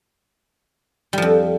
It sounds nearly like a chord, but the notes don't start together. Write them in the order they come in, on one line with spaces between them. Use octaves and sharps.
G3 F3 F2